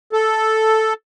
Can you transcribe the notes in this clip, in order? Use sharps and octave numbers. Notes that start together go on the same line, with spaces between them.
A4